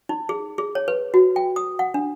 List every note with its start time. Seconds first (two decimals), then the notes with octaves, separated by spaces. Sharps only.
0.09 D#4
0.29 G#4
0.58 G#4
0.75 C#5
0.88 B4
1.14 F#4
1.36 G5
1.56 D#6
1.79 F#5
1.94 D4